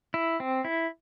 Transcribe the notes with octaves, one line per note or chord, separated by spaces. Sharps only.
E4
C4
E4